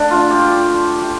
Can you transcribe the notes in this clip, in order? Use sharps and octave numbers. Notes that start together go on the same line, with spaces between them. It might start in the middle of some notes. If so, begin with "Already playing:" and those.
Already playing: D3 A3 D4
F4
G4
G4